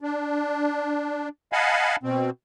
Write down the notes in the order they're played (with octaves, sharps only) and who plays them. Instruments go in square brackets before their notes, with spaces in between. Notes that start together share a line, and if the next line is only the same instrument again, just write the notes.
[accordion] D4
D#5 F5 F#5 G#5 A5 B5
B2 C4